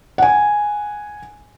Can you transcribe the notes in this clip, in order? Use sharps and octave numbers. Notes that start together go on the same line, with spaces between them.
F#5 G#5